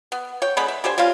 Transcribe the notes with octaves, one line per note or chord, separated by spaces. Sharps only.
B3
C#5 G5
D3 G#3 B3 B5
E5
D3 G4 C5 G#5
G3 C4 C#4 F4